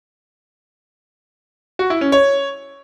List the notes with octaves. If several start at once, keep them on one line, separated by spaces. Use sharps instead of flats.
F#4
E4
C#4
C#5